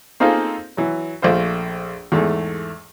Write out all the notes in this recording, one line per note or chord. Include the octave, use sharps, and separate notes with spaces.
A#3 C4 D#4 F4 G#4 A4
E3 F#3
A#1 A3 F4 C5
E2 G#2 A3